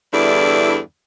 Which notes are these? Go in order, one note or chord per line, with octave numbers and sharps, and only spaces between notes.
E2 G2 D3 E4 D5